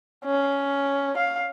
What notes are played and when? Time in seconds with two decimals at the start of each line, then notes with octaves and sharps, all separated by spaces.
0.24 C#4
1.17 F5